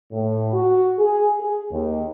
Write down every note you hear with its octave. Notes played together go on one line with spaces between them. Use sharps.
A2
F#4
G#4
G#4
D#2